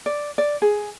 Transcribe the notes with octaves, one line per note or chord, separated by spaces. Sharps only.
D5
D5
G#4